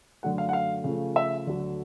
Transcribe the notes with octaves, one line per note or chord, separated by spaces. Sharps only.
F#2 D3 F#3 A3 F#5
F5
F#5
F5
C#3 F3 A3
E5
D2 D3 F#3